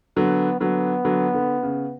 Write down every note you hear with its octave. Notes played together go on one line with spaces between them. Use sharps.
D3 F#3 B3
D3 F#3 B3
D3 F#3
D3
C#3